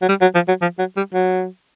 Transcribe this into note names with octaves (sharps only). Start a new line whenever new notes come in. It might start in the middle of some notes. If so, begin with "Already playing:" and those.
F#3
G3
F#3
F3
F#3
F3
F#3
G3
F#3